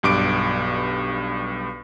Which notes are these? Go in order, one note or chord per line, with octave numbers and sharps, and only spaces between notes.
B1 G2 D6 D7